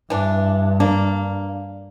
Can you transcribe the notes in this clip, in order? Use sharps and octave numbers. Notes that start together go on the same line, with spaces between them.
G2 E3 D4
A#3 D4